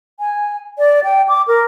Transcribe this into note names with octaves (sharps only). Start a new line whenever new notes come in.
G#5
D5
G5
D6
A#4